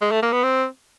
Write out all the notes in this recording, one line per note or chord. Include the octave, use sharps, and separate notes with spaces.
G#3
A3
A#3
B3
C4